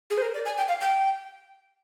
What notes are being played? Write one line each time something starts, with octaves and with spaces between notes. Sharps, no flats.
G#4
C5
A#4
D5
G#5
G5
F5
G5